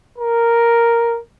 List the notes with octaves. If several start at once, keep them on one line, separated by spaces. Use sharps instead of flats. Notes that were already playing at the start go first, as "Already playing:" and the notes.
A#4